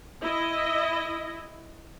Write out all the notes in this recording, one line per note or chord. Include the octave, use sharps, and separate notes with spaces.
E4 D#5